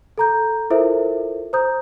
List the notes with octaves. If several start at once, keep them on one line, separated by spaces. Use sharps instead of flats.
A4 A#5 G6
E4 F4 A4 A#4 C5 E5
C5 A#5 D#6 G6